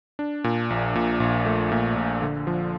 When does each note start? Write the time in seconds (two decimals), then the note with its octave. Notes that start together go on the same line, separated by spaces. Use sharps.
0.19 D4
0.44 A#2
0.70 A#1
0.95 A#2
1.20 A#1
1.46 A3
1.72 A#2
1.96 A#1
2.22 D3
2.47 F3